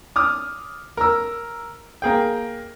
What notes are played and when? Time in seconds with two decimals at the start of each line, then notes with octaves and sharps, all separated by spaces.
0.16 D6 D#6 F6
0.97 A#4 E6
2.02 A#3 G#4 G5